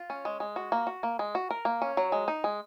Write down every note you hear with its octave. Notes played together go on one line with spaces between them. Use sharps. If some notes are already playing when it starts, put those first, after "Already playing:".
Already playing: F4
C#4
G#3
G#3
F#4
A#3
F#4
A#3
G#3
F#4
A#4
A#3
C#4
F#3
G#3
D#4
G#3